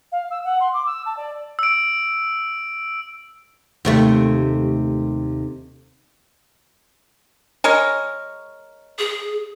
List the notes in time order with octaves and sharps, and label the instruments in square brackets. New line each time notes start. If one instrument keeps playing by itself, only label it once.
[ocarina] F5
E6
F#5
C6
D6
E6
A5
D5
[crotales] E6 D7
[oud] D#2 C3 A3
[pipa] G#3 A#4 C#5
[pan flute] G#4